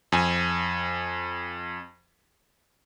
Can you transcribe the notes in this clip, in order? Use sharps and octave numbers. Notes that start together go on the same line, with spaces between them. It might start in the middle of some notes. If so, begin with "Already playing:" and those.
F2 G#5